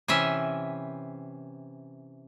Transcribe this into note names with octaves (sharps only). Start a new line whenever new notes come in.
C3 E3 C#4 E5